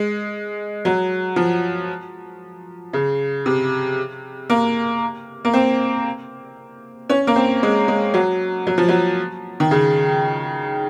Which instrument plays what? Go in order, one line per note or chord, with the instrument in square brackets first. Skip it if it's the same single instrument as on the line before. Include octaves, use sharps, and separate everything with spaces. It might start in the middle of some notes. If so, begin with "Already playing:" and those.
Already playing: [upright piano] G#3
F#3
F3
C#3
C3
A#3
A#3
C4
C#4
A#3
C4
G#3
G#3
F#3
F#3
F3
F#3
D#3
C#3